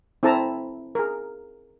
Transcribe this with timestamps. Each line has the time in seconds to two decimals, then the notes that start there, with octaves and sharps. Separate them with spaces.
0.23 C4 E4 A4 A5 A#5
0.95 G#4 A#4